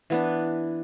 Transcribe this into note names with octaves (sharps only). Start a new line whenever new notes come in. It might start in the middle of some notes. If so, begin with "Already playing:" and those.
E3 B3 D4